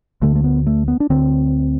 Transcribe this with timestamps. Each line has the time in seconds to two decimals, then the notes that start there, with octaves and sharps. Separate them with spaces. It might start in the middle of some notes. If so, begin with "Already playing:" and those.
0.22 D2 D3 A3
0.36 A3
0.44 B3
0.67 A3
0.88 B3
1.00 D4
1.10 D2 D3 C4